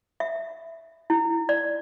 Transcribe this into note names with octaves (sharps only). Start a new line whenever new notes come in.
E5
E4
D5